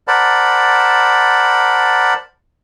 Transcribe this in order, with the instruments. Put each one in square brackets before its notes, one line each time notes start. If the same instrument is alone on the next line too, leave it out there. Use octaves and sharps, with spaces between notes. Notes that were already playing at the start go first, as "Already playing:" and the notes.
[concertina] A#4 C5 D5 F#5 A5 B5